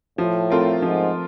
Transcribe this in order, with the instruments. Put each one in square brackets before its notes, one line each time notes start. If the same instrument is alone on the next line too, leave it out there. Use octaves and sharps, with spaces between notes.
[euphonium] A2 [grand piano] F3
[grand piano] A3 C4 F4 A#4
[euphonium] G#2 [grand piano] F3